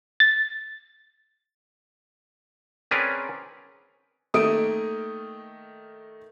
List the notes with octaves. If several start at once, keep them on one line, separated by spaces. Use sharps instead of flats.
A6
C4 C#4 G#4 A#4 B4 D5
D#3 A3 A#3 D#6 D7 D#7